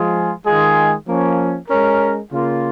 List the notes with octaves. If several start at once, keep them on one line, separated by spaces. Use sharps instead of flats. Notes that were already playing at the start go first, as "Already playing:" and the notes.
Already playing: F3 G#3 F4 G#4
D#3 G#3 F4 G#4
F3 A#3 C#4
G#3 C#4 A#4
C#3 A#3 F4